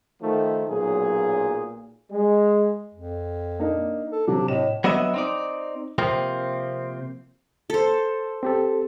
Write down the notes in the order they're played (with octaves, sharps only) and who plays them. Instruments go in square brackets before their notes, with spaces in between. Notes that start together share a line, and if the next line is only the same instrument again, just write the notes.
[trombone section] D#3 F3 A3
B1 A#2 F#3 G#4
G#3
[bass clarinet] F2
[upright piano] A#3 D4 D#4
[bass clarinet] A4
[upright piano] C3 F#3 [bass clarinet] D4
[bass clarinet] A2 [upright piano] D#5 E7
[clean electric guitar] F#3 B3 D4 D#5 E5
C4 D#4 D5
C3 F3 A#3 C4
[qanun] A4 C5
[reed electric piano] C4 G4 A4